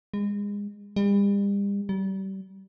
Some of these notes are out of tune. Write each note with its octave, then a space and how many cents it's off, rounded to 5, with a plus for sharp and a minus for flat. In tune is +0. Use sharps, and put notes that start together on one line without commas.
G#3 -30
G3 +40
G3 -30